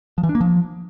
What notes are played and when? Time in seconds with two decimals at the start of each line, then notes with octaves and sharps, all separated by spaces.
0.18 F3
0.23 E3
0.29 D4
0.35 A#3
0.41 F3